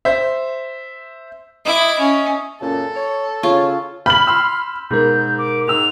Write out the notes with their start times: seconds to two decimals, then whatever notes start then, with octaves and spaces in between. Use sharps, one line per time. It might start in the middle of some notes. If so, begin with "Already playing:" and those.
0.05 C5 E5
1.65 E4 D#5 E5 D6
1.99 C#4
2.61 F#2 A#2 C#3 A4
2.96 C#5
3.43 C#3 F4 C#5
4.06 B5 F6 G6 F#7
4.27 C6 E6
4.91 G#2 B2 G#3 A#4 G6
5.38 D6
5.68 G#2 E6 F7